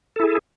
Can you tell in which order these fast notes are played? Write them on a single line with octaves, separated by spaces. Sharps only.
A4 E4 G#4